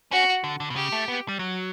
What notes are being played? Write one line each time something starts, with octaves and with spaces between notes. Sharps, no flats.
C#4 F#4
D3
D3
B2
C#3 G4
A3
B3
G3
F#3